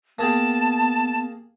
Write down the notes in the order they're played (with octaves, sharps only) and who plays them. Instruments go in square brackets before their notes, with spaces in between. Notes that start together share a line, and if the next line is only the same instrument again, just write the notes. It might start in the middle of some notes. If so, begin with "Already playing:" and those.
[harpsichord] A#3 G#4 G5 [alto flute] B3 [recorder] A5